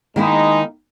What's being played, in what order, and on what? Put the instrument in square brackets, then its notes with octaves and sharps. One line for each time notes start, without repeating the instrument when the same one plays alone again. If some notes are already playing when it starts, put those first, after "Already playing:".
[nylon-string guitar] D#3 A#3 E4 [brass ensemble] G#3 D#4